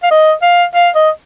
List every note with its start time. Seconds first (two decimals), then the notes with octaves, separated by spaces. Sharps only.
0.03 F5
0.11 D#5
0.42 F5
0.75 F5
0.95 D#5